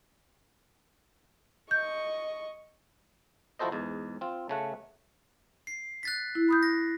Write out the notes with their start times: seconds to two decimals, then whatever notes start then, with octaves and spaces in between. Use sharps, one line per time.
1.71 D#5 C#6 G6
3.59 F3 E4 F#4 A4 C5 D#5
3.72 E2 G#2
4.21 C4 F4
4.49 C#3 A3 F#5
5.67 C7
6.03 F#6 A6 B6
6.35 E4
6.48 B5 D#6 G6
6.63 A#6